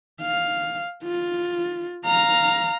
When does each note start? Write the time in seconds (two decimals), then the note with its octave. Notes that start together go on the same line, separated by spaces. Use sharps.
0.22 F5
1.04 F4
2.06 F5 A#5